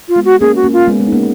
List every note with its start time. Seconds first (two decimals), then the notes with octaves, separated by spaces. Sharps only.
0.09 F4
0.16 G#3 B3
0.25 F#4
0.40 A#3 C#4 G#4
0.56 F#4
0.64 A#3 C#4
0.73 F4
0.88 G#3 B3
1.00 G#3 B3
1.07 D#4
1.12 A#3 C#4